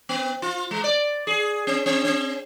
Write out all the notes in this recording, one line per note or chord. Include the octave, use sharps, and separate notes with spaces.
B3
F4
G#3
D5
G#4
C4
C4
C4